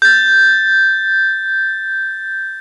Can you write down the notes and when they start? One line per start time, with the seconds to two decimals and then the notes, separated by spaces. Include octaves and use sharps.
0.02 G6 A6